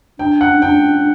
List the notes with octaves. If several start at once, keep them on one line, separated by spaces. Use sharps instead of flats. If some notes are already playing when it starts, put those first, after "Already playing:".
D4 G5
F#5
D4 G5